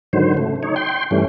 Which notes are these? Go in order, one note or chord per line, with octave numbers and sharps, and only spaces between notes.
G#2 D3 D#3 F#3 C5
C#3 A3
D#4 C#5
G5 C6
G2 E3 G3 A3 C#4